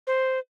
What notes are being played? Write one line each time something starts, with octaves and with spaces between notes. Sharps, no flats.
C5